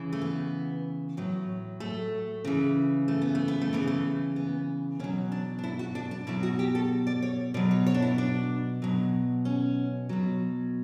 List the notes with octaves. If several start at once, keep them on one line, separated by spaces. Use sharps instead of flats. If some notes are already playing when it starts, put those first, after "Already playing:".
Already playing: C#3 E3
A3
B3
A2 F#3
A3
C#3 E3
A3
B3
A3
B3
A3
C#3 E3 B3
A3
B3
B2 F#3 C#4
D4
D4
E4
F#4
D4
D4
B2 F#3 E4
F#4
G4
A4
D5
C#5
B2 F#3 D5
C#5
C#5
D4
E4
D4
B2 F#3
C#4
B2 F#3